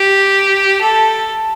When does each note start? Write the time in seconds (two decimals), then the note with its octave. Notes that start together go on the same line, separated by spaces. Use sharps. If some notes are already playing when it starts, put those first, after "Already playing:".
Already playing: G4
0.81 A4